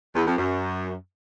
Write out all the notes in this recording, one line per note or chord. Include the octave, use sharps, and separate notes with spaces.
E2
F2
F#2